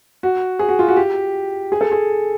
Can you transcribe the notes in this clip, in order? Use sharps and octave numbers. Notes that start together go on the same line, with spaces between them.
F#4
G#4
F#4
F4
F#4
G4
G#4
A4
G#4